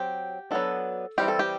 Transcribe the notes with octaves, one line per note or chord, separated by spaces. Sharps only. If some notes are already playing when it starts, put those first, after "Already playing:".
Already playing: F#3 C4 G4
F#3 B3 D4 A4
E3 G3 C4 G4
A4
G4